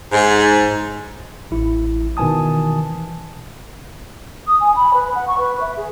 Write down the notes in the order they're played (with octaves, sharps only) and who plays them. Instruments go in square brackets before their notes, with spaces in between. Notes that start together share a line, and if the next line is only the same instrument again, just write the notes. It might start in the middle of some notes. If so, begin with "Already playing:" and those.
[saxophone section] G#2
[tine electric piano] A1 E4
B2 D#3 E3 G#5 A5 D#6
[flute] D#6
G#5
B5
B4
F#5
C#6
B4
E5
G#4